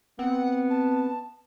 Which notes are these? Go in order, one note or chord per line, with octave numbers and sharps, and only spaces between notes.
B3 C4 F#5
A5